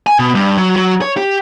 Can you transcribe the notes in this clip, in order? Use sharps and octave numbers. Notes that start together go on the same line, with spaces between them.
G#5
B2
G2
F#3
F#3
C#5
G4